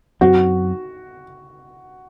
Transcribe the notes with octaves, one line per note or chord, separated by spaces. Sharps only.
F#2 F#3 C4 F#4